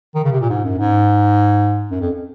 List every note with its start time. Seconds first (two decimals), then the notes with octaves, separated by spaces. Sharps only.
0.15 D#3
0.24 C#3
0.32 C3
0.41 A#2
0.50 G#2
0.64 F#2
0.78 G#2
1.91 F#2
2.01 F2